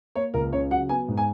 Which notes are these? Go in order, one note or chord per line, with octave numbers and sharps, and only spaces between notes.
A#3 C#5
C#2 A#4
C#3 C#5
F#3 F#5
B3 G#5
G#2
G#5